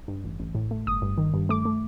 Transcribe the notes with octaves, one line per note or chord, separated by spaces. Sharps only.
G2
A1
A1
A2
A3
G1 D#6
G2
D#3
G2
A3 D6
A3